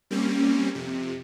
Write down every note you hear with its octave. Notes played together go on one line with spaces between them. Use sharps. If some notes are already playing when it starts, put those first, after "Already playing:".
G3 A#3 C4 C#4
F2 C3